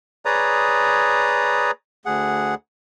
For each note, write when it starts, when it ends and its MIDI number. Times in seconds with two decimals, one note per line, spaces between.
0.25 1.71 68
0.25 1.71 71
0.25 1.71 73
0.25 1.71 74
0.25 1.71 82
0.25 1.71 87
2.06 2.55 38
2.06 2.55 68
2.06 2.55 78